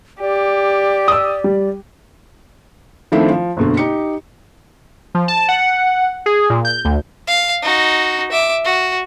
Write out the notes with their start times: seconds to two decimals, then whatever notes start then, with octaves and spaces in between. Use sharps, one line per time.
0.21 G4 D5
1.08 D#6 E6
1.44 G3
3.12 D#3 F3 A3 C4 D4 E4
3.31 F3
3.57 F#1 B2 D3
3.77 D#4 G4 C#7
5.15 F3
5.28 A5
5.48 F#5
6.26 G#4
6.50 A#2
6.65 G6
6.85 D2
7.27 F5
7.63 D#4 F#4
8.32 E5 D6
8.64 F#4